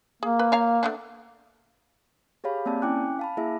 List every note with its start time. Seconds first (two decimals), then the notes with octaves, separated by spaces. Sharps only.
0.23 A#3 G#4
0.39 B4
0.52 C#5 F5 A#5
0.83 A3 B3 D4
2.44 G4 G#4 C#5 F5 B5
2.66 A#3 C4 D5 A5
2.82 C#4 E4 G5 G#5 D6 F#6
3.19 F5 A5 B5
3.37 A#3 E4 G#4 E5